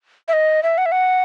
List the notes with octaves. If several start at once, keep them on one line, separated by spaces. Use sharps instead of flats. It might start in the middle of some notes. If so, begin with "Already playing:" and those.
E5
D#5
E5
F#5
E5
F#5